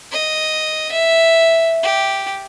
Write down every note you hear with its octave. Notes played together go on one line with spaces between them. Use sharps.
D#5
E5
G4